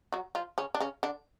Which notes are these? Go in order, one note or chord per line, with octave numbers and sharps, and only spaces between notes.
F#3 F#4
F3 F4
C#3 C#4
D4
C#3 C#4
D3 D4